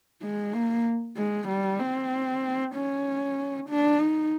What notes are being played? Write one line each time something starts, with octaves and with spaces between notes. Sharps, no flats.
G#3
A#3
G#3
G3
C4
C#4
D4
D#4